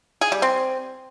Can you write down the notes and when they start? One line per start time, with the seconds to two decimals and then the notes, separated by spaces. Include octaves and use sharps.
0.21 G#4
0.32 G3
0.42 C4